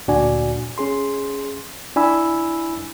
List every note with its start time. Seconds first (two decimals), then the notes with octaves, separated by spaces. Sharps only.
0.08 D2 A#2 D4 F#4 D5 G#5
0.78 C#4 G#4 C6
1.96 D4 E4 G#5 B5 E6